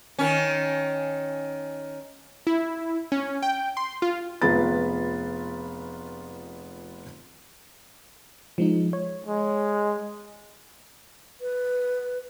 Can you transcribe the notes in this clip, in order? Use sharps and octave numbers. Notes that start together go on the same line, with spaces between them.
D#3 C#4
E4
C#4
G5
C6
F4
F1 G#3 B3 F4 B5 A6
F3 G#3 D#4
C#5
G#3
B4